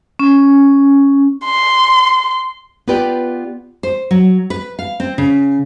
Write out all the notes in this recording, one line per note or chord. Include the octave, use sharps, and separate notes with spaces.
C#4
C6
B3 F4 G4 B4 D5 G5
C5
F#3
B4
F5
C4
C#3